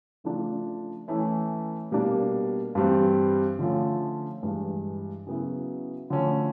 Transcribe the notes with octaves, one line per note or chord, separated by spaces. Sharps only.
C#3 F3 A3 D4 F4
E3 A3 C#4 E4
B2 G3 A#3 D4
G2 E3 G3 C4
D3 F3 A3 C#4 F4
G2 E3 G#3
C#3 F#3 B3 E4
D3 F3 A3 C#4